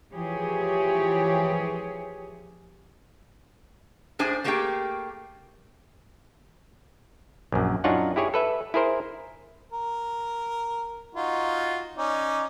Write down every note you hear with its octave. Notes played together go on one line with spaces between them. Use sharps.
E3 F3 G4 G#4 C#5
A2 D4 G#4 C5 G#5
A3 A#3 G4 G#4 C5 G5
A#1 F#2
F#2 D4 D#4 F4 C#5 F#5
E4 G4 G#4 C#5
A4 B4 E5
E4 G#4 A#4 C5
A#4
D#4 F4 F#4
C#4 D#4 D5